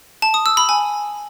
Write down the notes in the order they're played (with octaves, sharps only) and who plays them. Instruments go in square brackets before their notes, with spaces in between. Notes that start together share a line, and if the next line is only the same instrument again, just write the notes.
[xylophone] A5
D#6
E6
B5
G#5